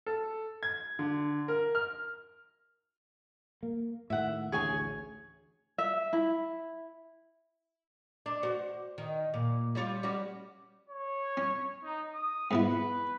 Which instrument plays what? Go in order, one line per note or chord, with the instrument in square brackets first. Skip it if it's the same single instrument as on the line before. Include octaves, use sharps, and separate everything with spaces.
[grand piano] A4
G#6
D3
A#4
F6
[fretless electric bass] A#3
[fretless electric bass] A2 D#3 [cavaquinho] E5 F#5
[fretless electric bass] A1 D2 [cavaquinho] G#4 C#5 G#5
[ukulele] E5
E4
[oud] D4
F#4 C5
D#3
A#2
G3 C#4 F4
G3 C#4 F#4
[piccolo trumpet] C#5
[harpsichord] C#4
[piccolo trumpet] D#4
D#6
[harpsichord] G#2 B3 E4 [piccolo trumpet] B4